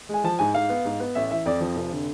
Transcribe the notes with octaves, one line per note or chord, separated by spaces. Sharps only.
G#3 G#5
F3 A5
G#2 G#5
G#2 F5
B3
G#2
B3
A1 E5
E3 E5
F2 D5
F3
F1
D3